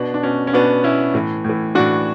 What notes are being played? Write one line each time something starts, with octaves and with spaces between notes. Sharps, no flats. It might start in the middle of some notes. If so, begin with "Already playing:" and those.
Already playing: B2 B3 D4
D4
B2 C#4
C#4
B2 B3 D4
B2 C#4 E4
A2 E3
A2 E3
A2 E3 D4 F#4